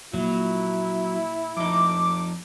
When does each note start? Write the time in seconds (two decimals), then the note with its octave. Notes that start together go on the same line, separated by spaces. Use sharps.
0.14 A#2 F#3 E4
1.57 F2 D#4 D6